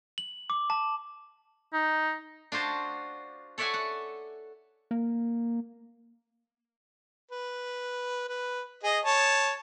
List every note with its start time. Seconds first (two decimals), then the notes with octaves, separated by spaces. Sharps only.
0.18 F#7
0.50 D6
0.70 A5
1.73 D#4
2.52 D4 F4 F#4 C5 A5
3.58 A4 C#5 D5 E5 F#5 G#5
3.74 F#5
4.91 A#3
7.31 B4
8.29 B4
8.83 G#4 D#5
9.05 C#5 A5